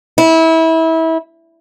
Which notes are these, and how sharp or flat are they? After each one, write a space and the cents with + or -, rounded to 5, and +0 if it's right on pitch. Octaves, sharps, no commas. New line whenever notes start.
E4 -25